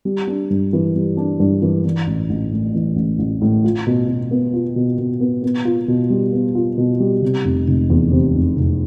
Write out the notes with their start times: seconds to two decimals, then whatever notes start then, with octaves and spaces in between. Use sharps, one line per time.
0.05 G3
0.27 D4
0.50 G2
0.73 E3
0.95 G3
1.17 D4
1.40 G2
1.62 E3
1.84 E3
2.07 A1
2.30 A1
2.51 A2
2.74 E3
2.96 A1
3.19 A1
3.41 A2
3.64 F4
3.87 B2
4.08 B2
4.31 B3
4.54 F4
4.76 B2
4.98 B2
5.20 B3
5.43 B3
5.65 F4
5.88 B2
6.10 G3
6.33 B3
6.55 F4
6.78 B2
7.00 G3
7.22 C3
7.44 F1
7.67 F1
7.90 E2
8.12 C3
8.35 F1
8.57 F1